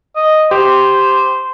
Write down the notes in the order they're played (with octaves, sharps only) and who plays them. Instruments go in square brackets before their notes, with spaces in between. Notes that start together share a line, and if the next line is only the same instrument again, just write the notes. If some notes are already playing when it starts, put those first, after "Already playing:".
[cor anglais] D#5
[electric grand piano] G4 [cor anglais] C5